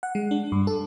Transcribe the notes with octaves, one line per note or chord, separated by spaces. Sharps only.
F#5
G#3
D4
G2
A4